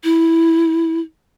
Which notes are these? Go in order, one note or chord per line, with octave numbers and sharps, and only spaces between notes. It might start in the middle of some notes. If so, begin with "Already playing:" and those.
E4